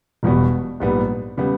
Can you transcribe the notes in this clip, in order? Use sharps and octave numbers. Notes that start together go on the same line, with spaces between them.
E1 E2 B2 G3 B3
A#1 G#2 G3 B3
C#3 G3 B3